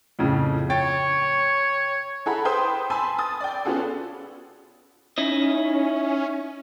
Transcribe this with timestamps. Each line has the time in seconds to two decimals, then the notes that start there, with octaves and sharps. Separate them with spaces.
0.19 F2 A2 C#3
0.70 C#5 G5 A6
2.26 E4 G#4 A4 F#5 A#5 B5
2.45 B4 C5 G5 C6 D#6 G6
2.90 G#5 A5 B5 C6 E6
3.18 D#6 A6
3.40 D5 G5
3.65 B3 C#4 F4 F#4 G#4 A4
5.18 C#4 D#4 E4 D#5